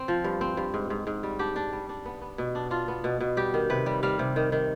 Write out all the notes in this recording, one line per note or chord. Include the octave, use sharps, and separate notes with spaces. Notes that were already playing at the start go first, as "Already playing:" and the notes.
Already playing: C4
F3
G2
C4
G2
G#2
G#2
G#2
G3
D4 G4
D4
G3
D4
B3
B3
B2
D4
D4 F4
B3
B2
B2
G3 G4
D#3
C3 B4
G3
G3 F5
C3
D#3
D#3